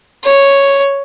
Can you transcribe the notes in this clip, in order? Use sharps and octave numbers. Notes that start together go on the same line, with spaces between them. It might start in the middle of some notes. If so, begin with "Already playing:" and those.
C#5